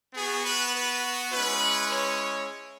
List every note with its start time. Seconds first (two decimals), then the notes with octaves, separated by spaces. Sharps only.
0.15 B3 F#4 G#4
0.45 B4
0.75 B4
1.33 G#3 C#4 E4 B4
1.92 C#5